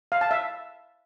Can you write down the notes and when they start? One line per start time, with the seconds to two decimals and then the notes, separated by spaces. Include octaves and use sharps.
0.12 F5
0.21 A5
0.31 E5